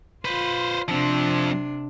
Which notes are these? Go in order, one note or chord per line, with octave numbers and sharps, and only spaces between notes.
F4 B4 C5
C3 F3 C4 D4